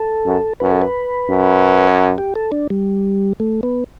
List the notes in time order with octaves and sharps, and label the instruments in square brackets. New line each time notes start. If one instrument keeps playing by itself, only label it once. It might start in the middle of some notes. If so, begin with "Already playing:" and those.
Already playing: [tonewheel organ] A4
[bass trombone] F#2
[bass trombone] F#2 [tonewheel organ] B4
[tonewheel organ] A4
B4
[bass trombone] F#2
[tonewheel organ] G4
A4
D4
G3
A3
B3